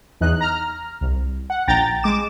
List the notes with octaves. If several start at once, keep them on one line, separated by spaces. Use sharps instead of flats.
E2 D#4 F#6
A#5 F6
C2
F#5
A#1 G5 A#5 A6
G#3 D6 E7